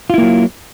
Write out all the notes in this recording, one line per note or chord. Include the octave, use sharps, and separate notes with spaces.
F#3 A#3 E4 F4